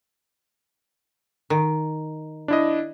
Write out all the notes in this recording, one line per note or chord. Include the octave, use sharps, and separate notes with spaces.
D#3
D4 E4 D#5